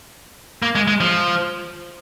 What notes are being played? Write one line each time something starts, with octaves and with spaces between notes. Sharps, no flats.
A#3
G#3
G#3
F3